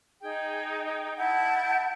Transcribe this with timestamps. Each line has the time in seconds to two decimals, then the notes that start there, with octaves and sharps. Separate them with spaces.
0.22 D#4 G#4 G5
1.18 E4 F#5 A5 G6